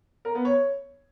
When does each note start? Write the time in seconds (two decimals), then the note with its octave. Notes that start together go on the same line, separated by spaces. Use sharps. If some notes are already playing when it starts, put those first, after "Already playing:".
0.25 A#4
0.35 B3
0.45 C#5